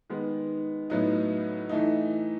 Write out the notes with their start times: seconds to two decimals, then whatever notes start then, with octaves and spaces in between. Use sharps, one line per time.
0.10 D#3 G#3 B3
0.90 A2 F#3 B3 D#4
1.69 E3 A3 D#4